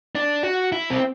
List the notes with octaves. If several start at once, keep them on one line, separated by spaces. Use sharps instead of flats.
D4
F#4
E4
C4